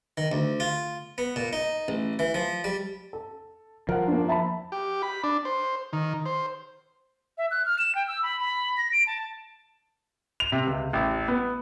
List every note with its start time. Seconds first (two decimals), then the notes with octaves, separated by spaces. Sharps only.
0.17 D#3
0.32 D2
0.60 F4
1.18 B3
1.36 A#2
1.53 D#4
1.88 A1
2.19 E3
2.34 F3
2.64 G3
3.13 A4
3.89 F3 A#4 F#5
4.08 A#3 D4
4.28 E5 A5 B5
4.72 G4
5.02 B5
5.24 D4
5.45 C5
5.93 D#3
6.26 C5
7.38 E5
7.51 F#6
7.66 F6
7.79 E7
7.95 G5
8.08 E6
8.23 B5
8.40 B5
8.77 A#6
8.92 D7
9.07 A5
10.40 F7
10.52 C3
10.67 C#2
10.93 A1
11.28 B3